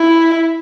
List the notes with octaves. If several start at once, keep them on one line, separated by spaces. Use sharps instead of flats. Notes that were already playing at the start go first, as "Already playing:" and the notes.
Already playing: E4